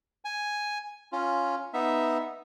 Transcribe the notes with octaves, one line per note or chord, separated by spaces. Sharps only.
G#5
C#4 F4
B3 D#4 E5